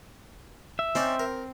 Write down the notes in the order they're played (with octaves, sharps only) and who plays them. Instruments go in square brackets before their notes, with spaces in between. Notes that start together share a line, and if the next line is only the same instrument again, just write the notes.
[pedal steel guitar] E5
[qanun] C4 [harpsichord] C#4 D#4 D5
[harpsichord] A#4